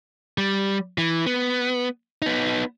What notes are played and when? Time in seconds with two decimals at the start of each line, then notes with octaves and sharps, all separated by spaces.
0.38 G3
0.98 E3
1.26 B3
2.22 B3 D#4